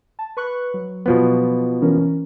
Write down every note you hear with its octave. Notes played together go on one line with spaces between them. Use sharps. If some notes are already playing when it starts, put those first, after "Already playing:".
A5
B4 C#6 F#6
F#3
B2 F3 B3
E3 C#4 A#4